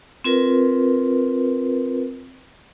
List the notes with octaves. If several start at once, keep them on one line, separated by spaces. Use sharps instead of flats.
C4 F4 A#4 B4